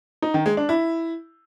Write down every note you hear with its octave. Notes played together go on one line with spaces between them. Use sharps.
D#4
D#3
G#3
D4
E4